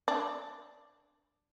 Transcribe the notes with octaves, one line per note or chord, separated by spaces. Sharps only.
D4